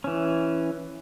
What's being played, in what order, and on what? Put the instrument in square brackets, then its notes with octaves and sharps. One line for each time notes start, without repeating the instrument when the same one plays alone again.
[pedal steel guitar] E3 C#4